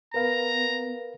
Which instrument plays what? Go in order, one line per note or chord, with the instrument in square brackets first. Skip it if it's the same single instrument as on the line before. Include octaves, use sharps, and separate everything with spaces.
[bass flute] B3 [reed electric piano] A#4 B4 F5 [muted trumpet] A#5